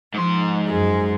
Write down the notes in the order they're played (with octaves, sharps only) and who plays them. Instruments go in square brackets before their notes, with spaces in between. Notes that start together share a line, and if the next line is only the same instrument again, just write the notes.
[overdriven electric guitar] G#2 C6 [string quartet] F3
[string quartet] F#2 G#3